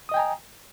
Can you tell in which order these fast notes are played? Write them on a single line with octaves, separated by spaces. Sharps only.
D#6 D#5 G5 G#5 A#5